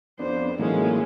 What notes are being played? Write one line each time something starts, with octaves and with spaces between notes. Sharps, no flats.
F2 B3 D4 C5
A2 E3 F#3 G#3 A#3 C#4 D#4